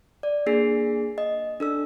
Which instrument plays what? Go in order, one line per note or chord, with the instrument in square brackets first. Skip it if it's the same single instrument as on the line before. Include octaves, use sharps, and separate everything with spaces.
[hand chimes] D5
A#3 D4 G#4 C7
D#5
D4 A4 E6